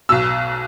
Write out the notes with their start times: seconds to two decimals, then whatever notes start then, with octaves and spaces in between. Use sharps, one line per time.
0.09 B1 B2 E6